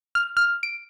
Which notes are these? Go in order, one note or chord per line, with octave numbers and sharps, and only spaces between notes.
F6
F6
D7